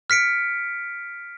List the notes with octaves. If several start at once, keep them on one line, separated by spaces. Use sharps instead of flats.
F6 B6 C#7 D7